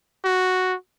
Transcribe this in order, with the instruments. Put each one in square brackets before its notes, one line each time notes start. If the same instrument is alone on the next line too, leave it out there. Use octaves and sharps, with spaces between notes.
[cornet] F#4